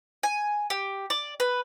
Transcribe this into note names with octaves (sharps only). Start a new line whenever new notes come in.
G#5
G4
D5
B4